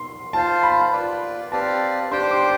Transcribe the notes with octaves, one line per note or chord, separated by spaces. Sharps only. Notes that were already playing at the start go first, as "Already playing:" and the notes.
Already playing: C6
F4 C5 F5 A5
B5
F4 B4 D5
C4 G4 B4 D5 F5 A5
D4 G4 C5 G5 C6
D6